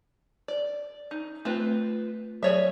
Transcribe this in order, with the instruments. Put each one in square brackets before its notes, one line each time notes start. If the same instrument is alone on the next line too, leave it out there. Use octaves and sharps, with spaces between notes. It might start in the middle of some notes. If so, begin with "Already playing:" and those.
[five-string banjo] D5
D#4
[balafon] A3 [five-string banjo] C4 F4 B4
[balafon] F#3 D5 [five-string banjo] G#4 C#5 E5